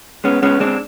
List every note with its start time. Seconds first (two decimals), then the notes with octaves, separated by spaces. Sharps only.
0.24 G#3 B3 C#4
0.43 G#3 B3 C#4
0.60 G#3 C4 D4